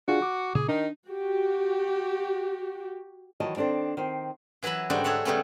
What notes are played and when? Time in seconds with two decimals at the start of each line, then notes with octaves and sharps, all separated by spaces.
0.08 D4 F4 F#4 G#4 F#5
0.22 D6
0.55 A#2 C#3 G#4
0.68 D#3 D4 D#4
1.09 F#4 G4
3.40 D#3 E3 F#3 D#5 A5
3.56 D#3 C4 D4 A4 C5
3.97 D#3 C4 C5
4.63 E3 F#3 B4 E5 B5
4.90 G#2 D3 G3 D4 D#4 F#4
5.04 G#4 A4 C#5 E5 F#5
5.25 C#3 G3 A3 B3 C#4